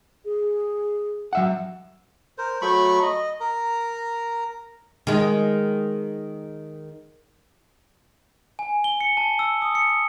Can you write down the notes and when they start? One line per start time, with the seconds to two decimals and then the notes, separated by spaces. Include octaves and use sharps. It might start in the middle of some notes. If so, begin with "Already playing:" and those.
0.25 G#4
1.33 F#3 E5 F#5
2.38 A#4 C5
2.62 F#3 A3 B5 C#6
3.02 D#5
3.40 A#4 A#5
5.07 D#3 G#3
8.59 G#5
8.84 G7
9.01 C#7
9.17 A5
9.39 E6
9.62 D#6
9.75 C#7